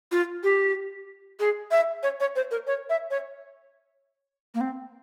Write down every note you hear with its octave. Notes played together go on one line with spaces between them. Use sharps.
F4
G4
G#4
E5
C#5
C#5
C5
A#4
C#5
E5
C#5
A#3
C4